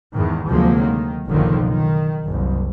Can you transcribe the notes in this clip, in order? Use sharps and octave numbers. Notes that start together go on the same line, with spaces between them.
E2 G#2 D#3
D2 C3 F3 F#3 G#3 A#3
D#3
F#1 B1 D3 D#3 F3
D#3
F#1 C2